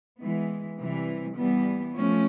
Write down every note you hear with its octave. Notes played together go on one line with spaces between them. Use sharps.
E3 G#3 B3
C3 E3 G3
E3 G3 B3
F3 A3 C#4